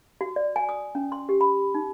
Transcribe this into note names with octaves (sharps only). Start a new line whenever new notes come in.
F#4
D5
G#5
D#6
C#4
C6
G4
B5
D#4